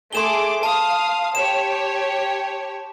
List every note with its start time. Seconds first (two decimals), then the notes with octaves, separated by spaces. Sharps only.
0.13 A3 G#4 C6 D6 E7 G7
0.63 F5 A5 D#6
1.35 G4 C#5 E7